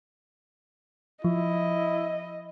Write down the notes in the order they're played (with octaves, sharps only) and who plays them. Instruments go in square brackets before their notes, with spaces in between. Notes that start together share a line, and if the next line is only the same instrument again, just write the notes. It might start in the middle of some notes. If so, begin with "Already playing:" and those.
[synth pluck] F3 [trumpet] E4 [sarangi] D#5